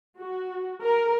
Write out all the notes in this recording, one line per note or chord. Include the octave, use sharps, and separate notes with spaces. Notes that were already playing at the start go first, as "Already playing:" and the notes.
F#4
A#4